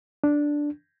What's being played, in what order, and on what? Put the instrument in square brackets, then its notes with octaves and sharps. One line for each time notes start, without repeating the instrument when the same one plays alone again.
[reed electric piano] D4